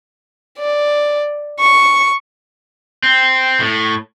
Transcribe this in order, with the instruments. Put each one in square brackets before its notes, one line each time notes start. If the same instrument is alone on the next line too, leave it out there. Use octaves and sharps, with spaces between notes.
[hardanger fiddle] D5
C#6
[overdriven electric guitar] C4
A2